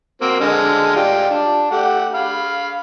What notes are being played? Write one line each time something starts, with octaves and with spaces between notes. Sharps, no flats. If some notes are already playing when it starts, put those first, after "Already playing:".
A#3 C4 F#4
D3 G#3 F6
F4 G4 D5
D4
A3 G4 F#5
F5 B5